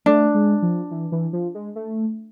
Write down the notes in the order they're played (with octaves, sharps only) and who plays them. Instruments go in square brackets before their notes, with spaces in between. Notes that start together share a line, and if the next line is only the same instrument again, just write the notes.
[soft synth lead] A3 [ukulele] D4
[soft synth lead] G#3
F3
E3
E3
F3
G#3
A3